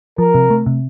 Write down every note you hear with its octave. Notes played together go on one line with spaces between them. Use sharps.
F3 A#4
C3
A3
C3